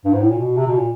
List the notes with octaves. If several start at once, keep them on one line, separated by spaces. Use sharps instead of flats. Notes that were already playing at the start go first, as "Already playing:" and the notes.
G2
G#2
A2
A#2
B2
C3
B2
A#2